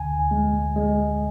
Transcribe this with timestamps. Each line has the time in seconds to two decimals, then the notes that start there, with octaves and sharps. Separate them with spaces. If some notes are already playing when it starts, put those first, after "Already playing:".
Already playing: D2 D3 G#5
0.31 G#3
0.76 G#3